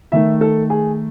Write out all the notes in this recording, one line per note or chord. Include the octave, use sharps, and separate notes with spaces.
D#3 A3 E5
A4
G#4